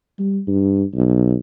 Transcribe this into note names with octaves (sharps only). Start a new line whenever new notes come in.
G3
G2
B1